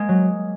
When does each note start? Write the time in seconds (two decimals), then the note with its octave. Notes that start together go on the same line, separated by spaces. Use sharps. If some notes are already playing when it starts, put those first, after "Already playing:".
Already playing: G#3 A#3
0.09 F#3